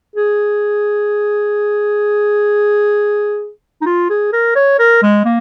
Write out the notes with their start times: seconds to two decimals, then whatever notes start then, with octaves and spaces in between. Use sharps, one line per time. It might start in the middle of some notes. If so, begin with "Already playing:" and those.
0.16 G#4
3.81 D#4
3.86 F4
4.10 G#4
4.32 A#4
4.55 C#5
4.79 A#4
5.02 G#3
5.25 A#3